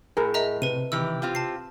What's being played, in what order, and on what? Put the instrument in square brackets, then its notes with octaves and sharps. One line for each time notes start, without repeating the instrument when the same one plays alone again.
[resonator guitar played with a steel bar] A2 [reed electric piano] G#4 A#4
[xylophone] D#5 E5 A#5
[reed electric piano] C3 [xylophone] B4 D#7
[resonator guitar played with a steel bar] D#3 E3 G4 [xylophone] E6
[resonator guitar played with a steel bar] C4 F4 G4
[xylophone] A5 C7